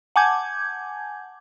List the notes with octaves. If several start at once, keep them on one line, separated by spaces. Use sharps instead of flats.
F#5 G#5 A5 D6 G6 G#6